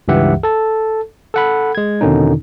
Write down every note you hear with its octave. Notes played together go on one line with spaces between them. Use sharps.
C#2 G2 E3 G4 E5 F#5
A4 A5
A4 F#5 B5
G#3 G#6
E2 B2 D3 D#3 C#4 D#4